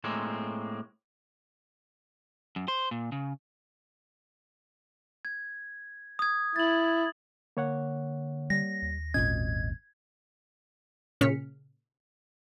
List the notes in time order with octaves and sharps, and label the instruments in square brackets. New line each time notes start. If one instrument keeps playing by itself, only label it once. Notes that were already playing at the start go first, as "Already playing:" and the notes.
[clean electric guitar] A2 G#3 A#3 C4
[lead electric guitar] F#2
C5
A#2
C#3
[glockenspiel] G#6
D#6 G#6
[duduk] E4 [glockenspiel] A6 F#7
[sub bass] D3 [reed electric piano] A#3 C#5 F#5
[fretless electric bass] G3 [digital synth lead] A#6
[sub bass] D#2
[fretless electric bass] G#1 A#2 C#4 [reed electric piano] D#5 [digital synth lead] G#6
[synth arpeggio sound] A#2 C#3 C#4 F6 B6 C#7